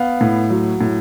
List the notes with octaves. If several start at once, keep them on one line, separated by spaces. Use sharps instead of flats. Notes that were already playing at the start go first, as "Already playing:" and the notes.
Already playing: B3 F5
A2
F#3
A2